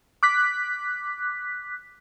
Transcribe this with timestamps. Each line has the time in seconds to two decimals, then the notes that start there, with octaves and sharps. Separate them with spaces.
0.23 D6 F#6 B6